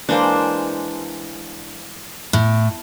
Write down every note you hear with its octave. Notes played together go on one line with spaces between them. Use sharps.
E3 G#3 A#3 D4 C5
A2